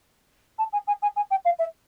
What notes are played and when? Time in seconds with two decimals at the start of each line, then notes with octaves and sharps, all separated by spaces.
0.59 A5
0.73 G#5
0.87 G#5
1.02 G#5
1.16 G#5
1.31 G5
1.45 F5
1.59 E5